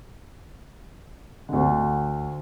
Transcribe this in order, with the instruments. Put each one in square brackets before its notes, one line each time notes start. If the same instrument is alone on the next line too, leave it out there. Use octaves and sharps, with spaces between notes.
[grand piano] D2 D3